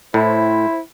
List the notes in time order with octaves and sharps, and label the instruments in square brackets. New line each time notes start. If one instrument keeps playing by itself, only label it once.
[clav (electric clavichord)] A2 [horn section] E4 C5